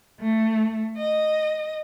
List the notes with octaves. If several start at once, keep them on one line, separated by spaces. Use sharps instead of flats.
A3
D#5